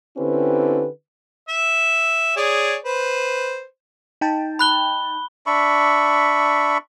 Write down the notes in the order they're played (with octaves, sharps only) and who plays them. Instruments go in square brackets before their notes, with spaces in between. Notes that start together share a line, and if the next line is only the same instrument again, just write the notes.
[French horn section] D3 C4 C#4 E4 G4 B4
[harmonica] E5
G#4 C#5 D5
B4 C5
[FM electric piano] D#4 G5 A5
[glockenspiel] B5 F#6 G7
[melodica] D4 E5 B5 C#6